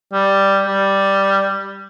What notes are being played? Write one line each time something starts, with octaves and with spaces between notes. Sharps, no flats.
G3
G3